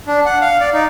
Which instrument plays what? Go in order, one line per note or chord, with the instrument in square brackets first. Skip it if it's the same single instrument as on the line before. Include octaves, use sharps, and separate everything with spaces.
[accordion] D4
F#5
F5
D5
D#4